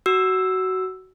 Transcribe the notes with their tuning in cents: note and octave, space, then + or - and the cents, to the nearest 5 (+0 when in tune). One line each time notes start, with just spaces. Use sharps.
F#4 +15 E6 +0